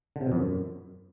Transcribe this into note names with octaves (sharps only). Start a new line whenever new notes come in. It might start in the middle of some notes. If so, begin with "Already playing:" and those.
D3
C3
B2
F2
F#2